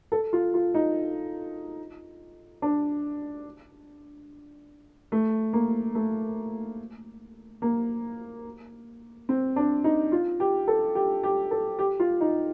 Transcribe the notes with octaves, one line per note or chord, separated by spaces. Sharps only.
A4
F4
F4
D#4
D4
A3
A#3
A3
A#3
C4
D4
D#4
F4
G4
A4
G4
G4
A4
G4
F4
D#4